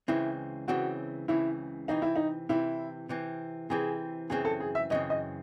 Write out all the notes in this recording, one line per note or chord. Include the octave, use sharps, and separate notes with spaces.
C#2 C#3 E3 C4 E4
C#2 C#3 E3 C4 F#4
C#2 C#3 E3 C4 E4
C3 E3 C4 D#4
E4
D#4
C3 E3 C4 E4
C3 E3 C4
C3 E3 C4 G#4
F#2 C#3 E3 C4 G#4
A4
G#4
E5
F#2 C#3 E3 C4 D#5
D#5